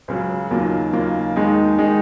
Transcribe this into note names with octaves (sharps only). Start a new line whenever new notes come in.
C#2 C#3 F#3
D#2 C#3 F#3 A#3 F4
D#2 C#3 F#3 A#3 F4
D#2 D#3 G#3 D#4
D#3 G#3 D#4